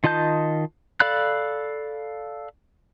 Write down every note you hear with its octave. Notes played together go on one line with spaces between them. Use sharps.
D#3 F4 D#5 A5 G6
A4 D5 F5 B5 F#6